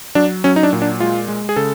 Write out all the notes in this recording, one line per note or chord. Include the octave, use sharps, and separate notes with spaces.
F#3 D4
F#3 C#4
D#4
D4
A#2
D4
G#3 F4
G#3
G#4
C#3 A4